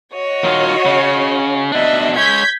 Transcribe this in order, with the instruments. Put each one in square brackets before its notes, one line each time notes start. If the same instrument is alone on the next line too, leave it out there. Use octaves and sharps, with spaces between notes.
[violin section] F#4 C#5 D#5
[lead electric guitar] D#3 F4
C#3
[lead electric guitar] B2 D4 [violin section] D#5 E5
[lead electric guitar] G#3 C#5 [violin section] G6 G#6 B6